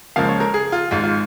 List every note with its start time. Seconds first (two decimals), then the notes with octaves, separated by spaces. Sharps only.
0.16 C#2 C#3 F3 A#3 F5
0.28 C#5
0.40 A#4
0.54 G#4
0.72 F4
0.91 G#1 G#2 G#3 F4
1.03 F4